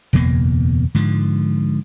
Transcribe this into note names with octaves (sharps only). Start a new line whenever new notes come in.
F#1 E2 B2 A#3
G#2 D3 F3